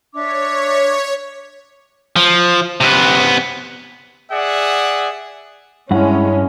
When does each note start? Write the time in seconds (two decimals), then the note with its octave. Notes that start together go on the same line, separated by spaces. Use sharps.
0.13 D4 C#5 E5 D6
2.16 F3
2.81 C3 B3
4.32 G#4 D5 E5 F#5
5.91 G2 G#3 C#4 E4 F#5